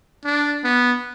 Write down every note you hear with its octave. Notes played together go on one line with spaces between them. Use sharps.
D4
B3